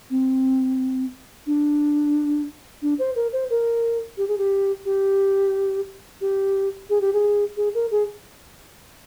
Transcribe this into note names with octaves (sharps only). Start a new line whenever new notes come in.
C4
D4
D4
C5
A#4
C5
A#4
G4
G#4
G4
G4
G4
G#4
G4
G#4
G#4
A#4
G#4